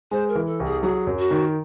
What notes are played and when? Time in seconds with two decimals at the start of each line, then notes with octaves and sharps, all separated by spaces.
0.11 G#3 C5
0.29 A#4
0.35 E3
0.47 A4
0.60 C2
0.65 G#4
0.83 F#3 G#4
1.07 F#2
1.19 F#4
1.31 D#3